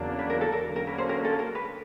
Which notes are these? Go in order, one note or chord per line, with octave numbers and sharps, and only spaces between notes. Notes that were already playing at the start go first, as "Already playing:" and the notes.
Already playing: E2 C#3 F#3 A#3 D4
B4
A#4
A4
A#4
D3 F#3 A#3 C#4
A#4
B4
C5
A#4
A4
A#4
B4